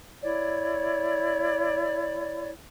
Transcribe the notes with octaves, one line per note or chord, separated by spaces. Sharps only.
E4 C#5 D5